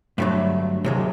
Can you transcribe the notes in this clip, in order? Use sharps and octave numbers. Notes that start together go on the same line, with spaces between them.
G2 D3 F#3 A3
D#2 C3 F#3 G#3